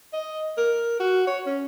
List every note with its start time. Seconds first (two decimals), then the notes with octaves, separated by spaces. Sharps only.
0.13 D#5
0.57 A#4
1.00 F#4
1.27 C#5
1.46 C#4